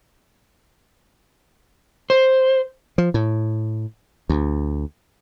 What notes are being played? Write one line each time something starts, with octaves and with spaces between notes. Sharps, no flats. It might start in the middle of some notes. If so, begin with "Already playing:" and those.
C5
F3
A2
D2